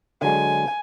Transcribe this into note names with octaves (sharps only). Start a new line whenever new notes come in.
D3 F#3 G#3 G#5